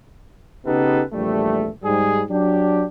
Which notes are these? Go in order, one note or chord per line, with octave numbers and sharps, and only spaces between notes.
C#3 B3 D#4 G4 A4 B4
A#1 E2 G3 A3
G#2 G3 G#4
F#3 D4 G4